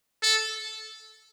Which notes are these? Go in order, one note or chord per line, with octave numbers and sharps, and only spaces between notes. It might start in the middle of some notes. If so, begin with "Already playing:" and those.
A4